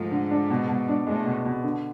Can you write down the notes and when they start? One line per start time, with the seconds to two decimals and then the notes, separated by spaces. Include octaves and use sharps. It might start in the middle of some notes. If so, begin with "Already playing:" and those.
Already playing: G#2 F3 A3
0.11 D3
0.31 D4
0.50 B2
0.68 B2
0.88 D4
1.07 A2 G#3
1.25 B2
1.45 B2
1.63 D3